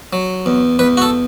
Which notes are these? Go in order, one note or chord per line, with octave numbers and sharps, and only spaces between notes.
F#3
E2
E2 B4
F#4
A4